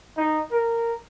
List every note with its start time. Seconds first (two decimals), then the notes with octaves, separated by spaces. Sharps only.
0.17 D#4
0.51 A#4